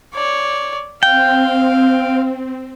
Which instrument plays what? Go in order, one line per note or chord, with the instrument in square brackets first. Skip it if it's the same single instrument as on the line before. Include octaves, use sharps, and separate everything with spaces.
[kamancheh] C#5 D5
[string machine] C4 [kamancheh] F5 [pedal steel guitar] G5